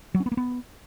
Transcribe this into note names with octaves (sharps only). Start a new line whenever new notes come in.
F#3
C#4
B3
A#3
B3